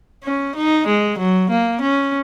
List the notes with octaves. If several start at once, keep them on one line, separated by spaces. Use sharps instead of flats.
C#4
D#4
G#3
F#3
A#3
C#4